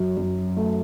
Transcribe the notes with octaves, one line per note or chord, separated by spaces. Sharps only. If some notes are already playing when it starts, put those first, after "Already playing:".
Already playing: F#2 F#3
F#2
A3